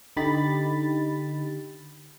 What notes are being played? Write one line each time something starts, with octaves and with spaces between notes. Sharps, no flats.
D3 D#4 G4 B5 A6